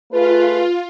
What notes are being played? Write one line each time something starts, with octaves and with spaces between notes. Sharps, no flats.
A3 F4 G#4 B4